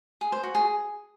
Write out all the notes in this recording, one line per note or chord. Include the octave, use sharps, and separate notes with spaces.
G#4
C5
F#4
G#4